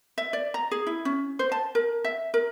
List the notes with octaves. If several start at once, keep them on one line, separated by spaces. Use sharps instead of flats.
E5
D5
A#5
G#4
E4
C#4
C5
A5
A#4
E5
A#4